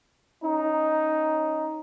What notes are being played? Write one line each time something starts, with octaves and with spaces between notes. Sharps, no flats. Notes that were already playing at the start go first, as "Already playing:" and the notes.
C#4 D#4